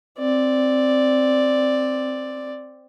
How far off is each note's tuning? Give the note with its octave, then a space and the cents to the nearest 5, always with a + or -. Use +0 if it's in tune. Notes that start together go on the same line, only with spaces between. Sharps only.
C4 +0 D5 +0